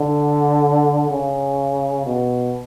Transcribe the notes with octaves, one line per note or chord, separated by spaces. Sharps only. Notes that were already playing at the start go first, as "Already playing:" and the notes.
Already playing: D3
C#3
B2